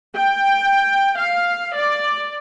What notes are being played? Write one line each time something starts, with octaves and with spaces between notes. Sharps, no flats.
G5
F5
D5